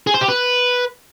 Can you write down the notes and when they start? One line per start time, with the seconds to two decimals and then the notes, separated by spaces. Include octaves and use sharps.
0.07 G#4
0.14 C5
0.21 G4
0.28 B4